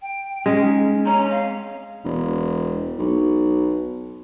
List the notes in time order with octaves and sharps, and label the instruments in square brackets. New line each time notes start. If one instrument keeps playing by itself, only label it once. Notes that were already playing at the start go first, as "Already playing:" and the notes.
[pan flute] G5
[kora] G#3 [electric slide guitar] C#4
[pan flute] D#4
[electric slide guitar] C4 C#5 [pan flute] A#5
[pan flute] F5
[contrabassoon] E1
B1